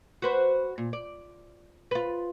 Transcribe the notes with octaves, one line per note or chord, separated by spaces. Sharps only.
F#4 B4 C5
A#2
D5
F4 B4